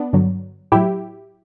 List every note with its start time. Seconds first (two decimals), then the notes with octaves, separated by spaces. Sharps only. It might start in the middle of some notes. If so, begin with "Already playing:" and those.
Already playing: B3 D4
0.13 G2 D3 F#3
0.72 A2 F#3 E4 G4